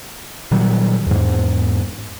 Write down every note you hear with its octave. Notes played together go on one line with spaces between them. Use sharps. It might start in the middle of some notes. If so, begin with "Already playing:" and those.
A#2 D#3 F#3 G3
E2 G#2